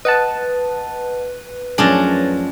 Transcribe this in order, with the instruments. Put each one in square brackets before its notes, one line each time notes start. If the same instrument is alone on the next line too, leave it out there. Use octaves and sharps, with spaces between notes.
[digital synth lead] B4 [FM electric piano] D#5 F#5 A5
[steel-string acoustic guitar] F#2 A2 F3 [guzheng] C#4 D4 [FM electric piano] G#4 A6 A#6